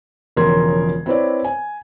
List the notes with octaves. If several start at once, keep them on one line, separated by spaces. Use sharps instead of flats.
E1 C#3 F3 A#4 C6 G#6
C4 E4 B4 C#5 D5
G#5